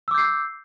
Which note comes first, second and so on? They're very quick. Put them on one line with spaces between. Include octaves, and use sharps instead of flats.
E6 D6 G6 C7